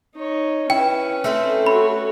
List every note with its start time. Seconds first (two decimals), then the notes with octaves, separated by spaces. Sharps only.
0.15 D#4 C#5
0.70 C#4 E4 B4 G5
1.24 A3 C4 A4
1.66 F#4 C#5 B5